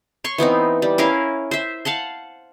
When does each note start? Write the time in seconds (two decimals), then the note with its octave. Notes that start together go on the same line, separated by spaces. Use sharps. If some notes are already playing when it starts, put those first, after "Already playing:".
0.24 C#5 C6 C#6
0.38 E3 B3 C4 D#4
0.82 G3
0.98 C#4 E4 A#4 F5
1.51 C5 E5
1.85 F5 F#5 A5 C6